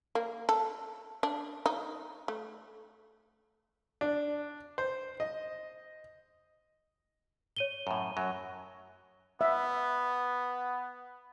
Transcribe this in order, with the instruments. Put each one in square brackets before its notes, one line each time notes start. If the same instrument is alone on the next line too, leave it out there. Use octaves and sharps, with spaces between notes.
[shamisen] A#3
A4
D4
D#4
A3
[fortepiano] D4
C5
D#5
[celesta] C#5 D#7 G7
[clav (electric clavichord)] F#2 A2
F#2 F#3
[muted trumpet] B3 [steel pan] E5